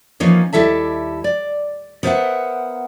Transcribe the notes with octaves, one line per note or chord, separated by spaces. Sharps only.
E3 F3 A#3 C#4 D#4
D#2 G3 E4 A4 E5 A5
D5
B3 A#4 C5 C#5 E5 F#5